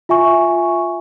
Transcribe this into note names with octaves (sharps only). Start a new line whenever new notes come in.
F4 E5 G#5 C#6